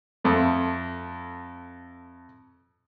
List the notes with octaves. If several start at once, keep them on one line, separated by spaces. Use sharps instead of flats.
F2 A3